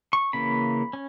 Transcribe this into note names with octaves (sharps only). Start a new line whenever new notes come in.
C#6
C#3 E3 A#3 C#4 B5
C#4